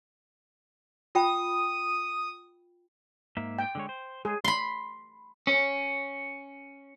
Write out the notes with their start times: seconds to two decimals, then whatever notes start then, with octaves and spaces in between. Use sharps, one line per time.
1.15 F4 G5 B5 D#6
3.37 G#2 A#3 E5
3.59 G5
3.75 D3 G#3 C#5
3.89 C5
4.25 G#3 G#4
4.44 B5 C6
5.47 C#4